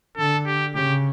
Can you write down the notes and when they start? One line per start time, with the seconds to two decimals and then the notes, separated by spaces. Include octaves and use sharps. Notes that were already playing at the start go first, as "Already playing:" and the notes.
0.17 D3 A4
0.46 G4
0.75 C#3 G4